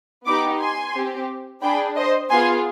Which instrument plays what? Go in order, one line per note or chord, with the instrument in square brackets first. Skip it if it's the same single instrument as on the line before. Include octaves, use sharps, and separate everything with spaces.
[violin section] B3 D#4 G4 B5 D6
G#5 C6
C4 G4
D4 G#4 G5 B5
C5 D#5
B3 F4 G#4 G#5 C6